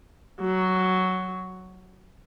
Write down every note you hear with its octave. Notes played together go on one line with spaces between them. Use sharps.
F#3